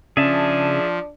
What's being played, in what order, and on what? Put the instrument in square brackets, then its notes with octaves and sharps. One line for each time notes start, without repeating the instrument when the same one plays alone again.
[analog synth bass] C#3 [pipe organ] F3 [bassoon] D4 [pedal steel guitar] G#4 E5 A5